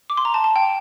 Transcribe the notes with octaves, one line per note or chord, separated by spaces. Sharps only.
D6
C6
A#5
A5
A5
G5